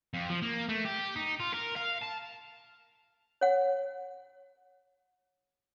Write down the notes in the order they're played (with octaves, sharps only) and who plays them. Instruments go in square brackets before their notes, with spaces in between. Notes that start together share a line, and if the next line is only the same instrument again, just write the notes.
[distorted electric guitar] F2
F3
A#3
A3
G4
D#4
F4
A#4
F5
A5
[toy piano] C#5 F#5